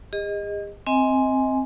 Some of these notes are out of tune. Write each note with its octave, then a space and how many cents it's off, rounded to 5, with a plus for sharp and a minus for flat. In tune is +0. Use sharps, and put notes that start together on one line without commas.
G#4 -45 D#5 +0
C4 +0 D#5 +30 G#5 +0